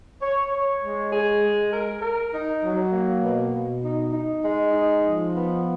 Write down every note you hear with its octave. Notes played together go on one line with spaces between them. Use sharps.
C#5
C#5
G#3
G#4
G#3
A#4
A#4
D#4
F#3
A#3
B2
B2
D#4
D#4
G#3
D#4
F3
B3